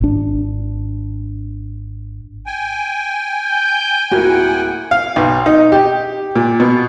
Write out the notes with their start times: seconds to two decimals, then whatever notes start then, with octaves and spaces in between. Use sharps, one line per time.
0.01 G#1 D4
2.46 G5 G#5
3.45 G6
4.12 D1 A#3 E4 F#4 F#5
4.91 F5
5.16 B1
5.46 D#4
5.72 G4
6.35 A#2
6.60 B2